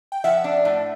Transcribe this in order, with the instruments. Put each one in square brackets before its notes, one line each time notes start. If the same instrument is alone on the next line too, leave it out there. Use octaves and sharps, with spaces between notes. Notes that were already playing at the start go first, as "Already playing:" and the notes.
[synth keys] G5
[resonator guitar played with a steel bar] F3 [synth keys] E5 F#5
[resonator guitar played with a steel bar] D4
A2